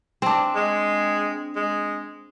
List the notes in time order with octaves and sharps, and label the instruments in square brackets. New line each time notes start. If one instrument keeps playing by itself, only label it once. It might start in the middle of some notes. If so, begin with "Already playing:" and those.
[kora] C4 D4
[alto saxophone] G#3
G#3